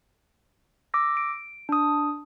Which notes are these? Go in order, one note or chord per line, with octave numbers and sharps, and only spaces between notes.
D6 E6 A#6
D7
D4 D#6